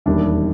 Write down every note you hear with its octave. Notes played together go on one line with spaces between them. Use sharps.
E1 D#2 D#3 G3 D4 E4